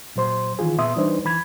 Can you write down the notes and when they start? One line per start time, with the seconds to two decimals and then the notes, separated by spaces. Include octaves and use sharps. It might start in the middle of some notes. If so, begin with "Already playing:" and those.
0.16 A#2 F#3 C5 C6
0.59 D#3 E3 F4 G#4
0.79 A#2 B3 E5 C6 D#6
0.96 E3 G3 D4 D#4 B4 C5
1.25 E3 B5 G#6